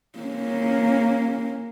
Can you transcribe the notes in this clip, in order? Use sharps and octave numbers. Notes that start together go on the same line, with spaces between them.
A#3 C#4